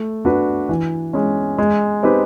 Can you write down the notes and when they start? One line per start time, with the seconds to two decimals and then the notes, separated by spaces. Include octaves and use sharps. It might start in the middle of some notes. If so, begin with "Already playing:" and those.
Already playing: A3
0.25 D4 F#4 B4
0.69 E3
1.13 G#3 C#4
1.58 G#3
2.03 C4 D#4 G4 B4